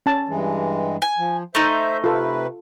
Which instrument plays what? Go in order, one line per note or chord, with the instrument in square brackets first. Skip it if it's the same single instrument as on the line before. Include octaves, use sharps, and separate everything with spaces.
[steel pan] C#4 A5
[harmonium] G2 E3 G#3
[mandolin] G#5
[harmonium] F3
[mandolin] A3 D#4 [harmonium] C5 E5
[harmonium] C3 B4 [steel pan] F4 A4